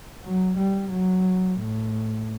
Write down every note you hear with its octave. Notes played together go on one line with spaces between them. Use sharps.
F#3
G3
F#3
A2